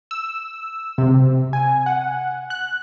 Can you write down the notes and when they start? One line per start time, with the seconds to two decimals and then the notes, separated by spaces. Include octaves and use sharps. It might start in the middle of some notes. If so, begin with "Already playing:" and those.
0.11 E6
0.98 C3
1.53 G#5
1.86 F#5
2.50 F#6